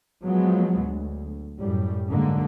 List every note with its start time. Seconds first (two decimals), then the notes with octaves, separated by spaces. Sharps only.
0.23 F3 F#3 G#3 B3
0.80 D2
1.59 F#2 A2 G3
2.07 G#2 D3 F#3 G#3 A#3